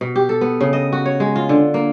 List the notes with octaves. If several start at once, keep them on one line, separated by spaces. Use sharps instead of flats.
B2
G4
A4
B3
C#3
D#5
F#4
C#5
G#3
F4
D3
A#3